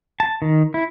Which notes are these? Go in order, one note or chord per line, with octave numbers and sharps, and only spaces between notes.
A5
D#3
E4